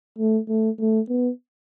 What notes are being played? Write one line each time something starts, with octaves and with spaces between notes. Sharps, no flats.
A3
A3
A3
B3